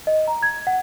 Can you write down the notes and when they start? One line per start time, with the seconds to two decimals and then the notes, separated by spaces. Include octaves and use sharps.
0.07 D#5
0.28 A#5
0.43 G#6
0.67 F#5